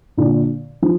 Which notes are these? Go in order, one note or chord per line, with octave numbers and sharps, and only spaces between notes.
A#2 D3
F3